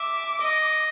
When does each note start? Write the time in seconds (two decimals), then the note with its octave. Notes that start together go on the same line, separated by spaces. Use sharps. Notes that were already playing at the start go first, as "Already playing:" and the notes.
Already playing: E5 D6
0.41 D#5